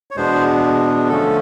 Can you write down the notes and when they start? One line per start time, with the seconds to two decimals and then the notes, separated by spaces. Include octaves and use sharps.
0.11 C#5
0.16 E2 B2 G#3 B3 D4 C5
1.09 D3 F3 A3 C#4 A4